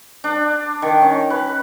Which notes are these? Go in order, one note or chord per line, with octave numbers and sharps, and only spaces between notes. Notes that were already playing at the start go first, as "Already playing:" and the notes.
D4
D#3
C#4
B4